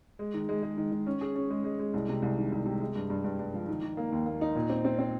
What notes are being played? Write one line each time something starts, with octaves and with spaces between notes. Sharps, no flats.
G#3
D#3
G#3
G#3
D#3
D#3
C#4
G#4
C#4
G#3
G#3
G#3
C2
C3
C2
D#3
C2
C3
G#3
G2
G2
G2
G2
F3
D#3
D#3
A#3
D#2
A#3
D#4
A#2
C4
C4
C4